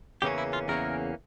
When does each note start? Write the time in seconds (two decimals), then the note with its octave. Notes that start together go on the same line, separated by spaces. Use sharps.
0.22 E2 C#3 E3 A#3 C#4 G4
0.38 E4
0.53 F4
0.68 E2 C#3 E3 A#3 C#4 A#4